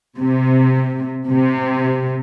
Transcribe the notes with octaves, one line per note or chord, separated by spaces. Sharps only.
C3
C3